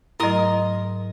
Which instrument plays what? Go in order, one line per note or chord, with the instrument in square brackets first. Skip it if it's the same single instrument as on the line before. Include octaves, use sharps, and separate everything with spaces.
[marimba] G#2 F#3 A3 [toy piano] E4 D#5 [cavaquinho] A#4 C6 D#6